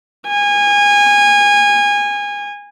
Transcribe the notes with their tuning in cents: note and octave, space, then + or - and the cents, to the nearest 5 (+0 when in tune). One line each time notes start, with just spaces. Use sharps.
G#5 -25